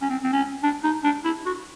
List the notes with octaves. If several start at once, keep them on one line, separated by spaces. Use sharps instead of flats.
C#4
C4
C4
C#4
D4
D#4
D4
E4
F#4